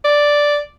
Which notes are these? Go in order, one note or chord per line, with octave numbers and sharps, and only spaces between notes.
D5